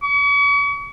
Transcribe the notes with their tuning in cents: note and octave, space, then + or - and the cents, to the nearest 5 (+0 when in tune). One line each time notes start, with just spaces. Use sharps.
C#6 +40